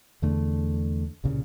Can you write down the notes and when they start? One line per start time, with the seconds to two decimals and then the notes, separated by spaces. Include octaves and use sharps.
0.22 E2 D3 A3 D4
1.24 C2 A#2 C#3